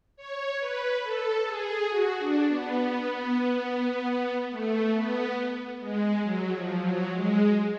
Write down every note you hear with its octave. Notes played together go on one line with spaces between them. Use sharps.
C#5
B4
A4
G#4
F#4
D4
B3
A3
B3
G#3
F#3
F3
F#3
G#3